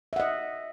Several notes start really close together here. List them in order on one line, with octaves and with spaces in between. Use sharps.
E5 F#5 D#5